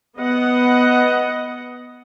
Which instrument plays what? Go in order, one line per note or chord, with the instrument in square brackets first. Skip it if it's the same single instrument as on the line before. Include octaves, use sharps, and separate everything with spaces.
[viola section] B3 D#5 F#5